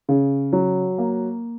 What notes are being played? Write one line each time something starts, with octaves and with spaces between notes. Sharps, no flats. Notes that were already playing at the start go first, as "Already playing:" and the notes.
C#3
F#3
A#3